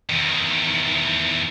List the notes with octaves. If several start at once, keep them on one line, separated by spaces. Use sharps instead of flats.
E2 D#3